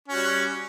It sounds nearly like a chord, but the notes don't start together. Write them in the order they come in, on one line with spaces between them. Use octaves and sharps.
C#4 F#4 G3